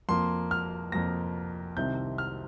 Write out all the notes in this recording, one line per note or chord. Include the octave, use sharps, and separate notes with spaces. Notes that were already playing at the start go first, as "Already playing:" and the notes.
F2 F3 A#3 C6
F6
F2 F3 A#3 A#6
C2 C3 D#3 C4 G6
F6